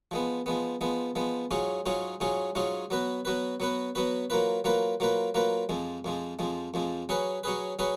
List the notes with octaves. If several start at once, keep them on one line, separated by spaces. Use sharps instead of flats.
F3 G#3 B3
F3 G#3 B3
F3 G#3 B3
F3 G#3 B3
G#2 F#3 C#4 F4 G#4
G#2 F#3 C#4 F4 G#4
G#2 F#3 C#4 F4 G#4
G#2 F#3 C#4 F4 G#4
F#3 B3 F#4 B4
F#3 B3 F#4 B4
F#3 B3 F#4 B4
F#3 B3 F#4 B4
F#3 A#3 F4 B4
F#3 A#3 F4 B4
F#3 A#3 F4 B4
F#3 A#3 F4 B4
F2 F3 G#3
F2 F3 G#3
F2 F3 G#3
F2 F3 G#3
F#3 C#4 G#4 B4
F#3 C#4 G#4 B4
F#3 C#4 G#4 B4